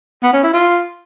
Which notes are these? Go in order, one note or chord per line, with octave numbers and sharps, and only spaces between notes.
B3
C#4
E4
F4